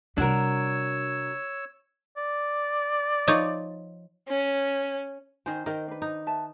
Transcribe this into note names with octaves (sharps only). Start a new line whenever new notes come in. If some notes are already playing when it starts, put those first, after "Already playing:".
C3 G3 D4 F#4 A#4 C#5 E6
D5
F3 D#4 C#5
C#4
D#3 C5 G#5
D#3 A#4 D#5
D4 B4
D#4
B4 E5 A5